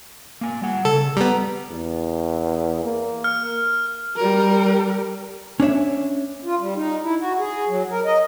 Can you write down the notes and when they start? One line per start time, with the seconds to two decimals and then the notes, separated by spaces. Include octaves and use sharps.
0.41 A#3 G#5
0.62 G3 F#5
0.85 C#3 A4
1.17 G3 B3 A#5
1.71 E2
2.84 A#3
3.24 F6
4.16 G3 A#4
5.60 C#4 D4 C#5 E5
6.45 F4
6.60 G3
6.76 D#4
7.03 E4
7.20 F#4
7.39 G#4
7.68 F#3
7.91 A#4
8.06 D#5